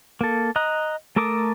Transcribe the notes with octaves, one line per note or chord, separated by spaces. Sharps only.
A#3 A4
D#5 A#5 D#6 F#6
A3 A4 A#4 D6 D#6